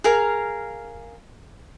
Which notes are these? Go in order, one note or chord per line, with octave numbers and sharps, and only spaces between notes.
G#4 A#4 F5